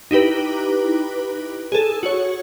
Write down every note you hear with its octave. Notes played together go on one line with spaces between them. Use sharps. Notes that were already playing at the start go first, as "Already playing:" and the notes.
D#4 E4 G4 B4
G#4 A4
F#4 C#5